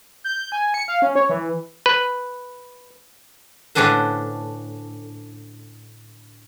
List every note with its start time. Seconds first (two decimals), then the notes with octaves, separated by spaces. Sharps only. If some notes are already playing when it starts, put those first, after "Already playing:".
0.24 G6
0.52 G#5
0.74 C#7
0.88 F5
1.02 C#4
1.16 C#5
1.29 E3
1.86 B4
3.75 A2 D3 C#4 D4 B4 C5